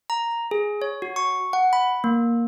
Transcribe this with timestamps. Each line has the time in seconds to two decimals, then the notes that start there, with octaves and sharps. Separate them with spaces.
0.10 A#5
0.51 G#4
0.82 C#5
1.02 F#4
1.16 C#6
1.53 F#5
1.73 B5
2.04 A#3